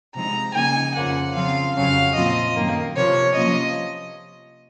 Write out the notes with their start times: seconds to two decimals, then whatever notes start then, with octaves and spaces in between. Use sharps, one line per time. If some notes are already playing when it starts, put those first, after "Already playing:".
0.14 C3 F3 G#3 C4 D#4 A#5
0.54 C#3 F3 A#3 D#4 G#5
0.94 F2 C#3 F3 A#3 F#5
1.35 C#3 F3 C4 F4 F5
1.75 F2 C#3 F#3 C#4 F5
2.15 A#2 F3 C4 F4 D#5
2.56 F#2 D#3 A#3
2.95 C3 F3 A#3 C#5
3.36 C3 F3 A#3 C#4 F4 D#5